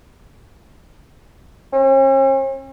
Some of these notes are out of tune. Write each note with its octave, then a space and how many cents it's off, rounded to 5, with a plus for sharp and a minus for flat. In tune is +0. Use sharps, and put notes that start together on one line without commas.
C#4 -45